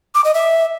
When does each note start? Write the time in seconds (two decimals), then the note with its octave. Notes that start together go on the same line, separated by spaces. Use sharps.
0.15 D6
0.24 D#5
0.34 E5